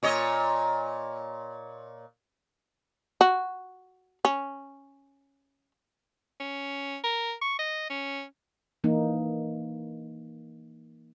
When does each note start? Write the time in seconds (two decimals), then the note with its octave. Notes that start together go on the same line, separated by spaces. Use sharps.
0.03 A#2 C#5 D#5
3.21 F#4
4.25 C#4
6.40 C#4
7.04 A#4
7.42 C#6
7.59 D#5
7.90 C#4
8.84 E3 A#3 D#4